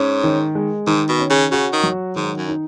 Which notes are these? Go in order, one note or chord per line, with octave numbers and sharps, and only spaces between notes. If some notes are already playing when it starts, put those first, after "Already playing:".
Already playing: G#2 C#4
D#3
G#3
G#2 D#3
B2
C#4
C#3
C#3 F#4
D#3
F#3
G#2 D#3
F#2
D#4